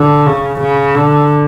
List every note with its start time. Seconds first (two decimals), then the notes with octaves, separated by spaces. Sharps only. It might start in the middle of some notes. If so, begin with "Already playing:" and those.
Already playing: D3
0.27 C#3
0.61 C#3
0.96 D3